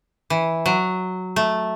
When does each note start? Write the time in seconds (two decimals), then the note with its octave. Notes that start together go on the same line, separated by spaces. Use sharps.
0.30 E3
0.66 F#3
1.36 A3